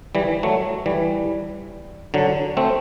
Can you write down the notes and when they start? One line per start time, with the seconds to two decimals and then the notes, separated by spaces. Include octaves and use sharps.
0.15 E3 G3
0.43 F#3 A3
0.86 E3 G3
2.14 D3 F#3
2.57 A3 C4